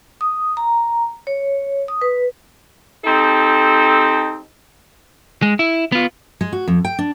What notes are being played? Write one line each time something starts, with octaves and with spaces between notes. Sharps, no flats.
D#6
A#5
C#5
D#6
B4
C4 D#4 G4 A4
G#3
E4
B3 F4
G#3
F#4
F2
G5
D4